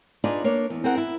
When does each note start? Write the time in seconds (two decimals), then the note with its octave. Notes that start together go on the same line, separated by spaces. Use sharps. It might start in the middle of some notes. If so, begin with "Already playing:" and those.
0.24 D4 D#4 F4 G#4 B4 D5
0.44 A#3 D4 C#5
0.70 E2
0.84 C4 G#4 A#4 F#5
0.98 E4